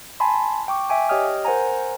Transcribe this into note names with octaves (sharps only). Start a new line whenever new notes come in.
G#5 A5 B5 C6
G5 C#6 D6
E5 G5 G#5 D6
G4 C#5 D#5 G5 D#6 F6
A#4 C5 F#5 G#5 A#5